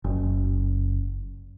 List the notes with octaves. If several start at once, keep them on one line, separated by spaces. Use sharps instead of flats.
F#1